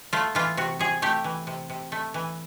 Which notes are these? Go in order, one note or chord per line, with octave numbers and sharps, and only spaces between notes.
A3 F4
E3 F4
C3 F#4
C3 G#4
A3 G4
E3
C3
C3
A3
E3